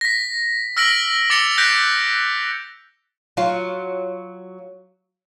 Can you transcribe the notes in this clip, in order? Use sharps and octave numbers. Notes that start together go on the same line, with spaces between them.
A#6 B6
E6 F6 A#6 B6 D7 F#7
D6 A6 C#7 F7 G7
F#6 G6 A#6 B6 D7
F#3 F4